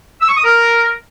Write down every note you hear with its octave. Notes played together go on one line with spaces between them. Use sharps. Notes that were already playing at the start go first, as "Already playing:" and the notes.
E6
C#6
D#6
A#4